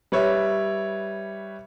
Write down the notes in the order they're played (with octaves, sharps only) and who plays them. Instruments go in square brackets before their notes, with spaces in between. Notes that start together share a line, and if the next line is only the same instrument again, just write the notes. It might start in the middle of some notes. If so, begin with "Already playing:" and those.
[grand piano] G3 B4 C#5 E5